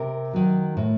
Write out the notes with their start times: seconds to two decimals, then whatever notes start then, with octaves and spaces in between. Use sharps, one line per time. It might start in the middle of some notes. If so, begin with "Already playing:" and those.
Already playing: C3 A#4
0.33 D#3 F#3
0.77 A2